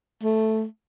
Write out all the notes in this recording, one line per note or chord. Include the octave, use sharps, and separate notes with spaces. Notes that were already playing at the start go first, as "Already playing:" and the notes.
A3